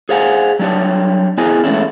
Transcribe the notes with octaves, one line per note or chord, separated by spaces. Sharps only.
G#4 C5 F5 F#5 G#5
F#3 G3 D4 G4 C#5
B3 E4 G#4 C5 D#5 G#5
E3 G#3 A3 B3 C#4 E4